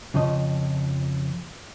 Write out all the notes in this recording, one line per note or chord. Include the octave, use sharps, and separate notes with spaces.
F2 C#3 F3 D#5